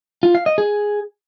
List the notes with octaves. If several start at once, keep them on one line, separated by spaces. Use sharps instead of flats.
F4
F5
D#5
G#4